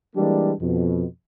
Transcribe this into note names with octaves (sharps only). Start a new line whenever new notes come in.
E3 G3 G#3 A#3 D4
F2 B2